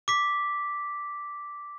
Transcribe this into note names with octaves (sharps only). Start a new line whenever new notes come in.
D6 B6